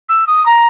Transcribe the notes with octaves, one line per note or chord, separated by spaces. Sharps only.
E6
D#6
A#5